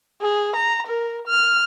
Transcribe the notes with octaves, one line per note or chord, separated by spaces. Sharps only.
G#4
A#5
A#4
F6